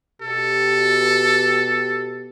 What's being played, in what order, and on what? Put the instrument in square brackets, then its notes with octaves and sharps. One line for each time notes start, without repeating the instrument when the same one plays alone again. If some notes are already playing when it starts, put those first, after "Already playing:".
[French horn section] B2 G4 [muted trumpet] A4